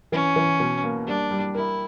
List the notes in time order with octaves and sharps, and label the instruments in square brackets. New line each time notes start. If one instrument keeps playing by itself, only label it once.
[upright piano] E3 [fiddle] C#4
[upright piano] E3
B2
A#3
[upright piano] G3 [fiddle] D4
[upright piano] G3
[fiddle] E4 [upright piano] A#4